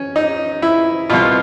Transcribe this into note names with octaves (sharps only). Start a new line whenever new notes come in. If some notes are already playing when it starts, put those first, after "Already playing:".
Already playing: C#4
D#4
E4
C2 B2 F4